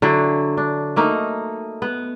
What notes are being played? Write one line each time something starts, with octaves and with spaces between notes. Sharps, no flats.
D3 F#3 E4 G5
D4
A3 A#3 D#4
B3